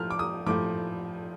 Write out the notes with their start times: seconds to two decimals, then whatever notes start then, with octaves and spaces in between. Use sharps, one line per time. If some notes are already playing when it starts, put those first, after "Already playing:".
Already playing: A2 F3 F6
0.10 D6
0.19 D#6
0.46 A2 F3 D6